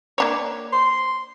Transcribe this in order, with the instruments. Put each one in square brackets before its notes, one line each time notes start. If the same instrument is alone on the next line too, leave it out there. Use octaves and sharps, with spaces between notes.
[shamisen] A#3 D4 C#5
[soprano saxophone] C6